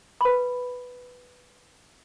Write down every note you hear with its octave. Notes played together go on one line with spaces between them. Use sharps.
B4 B5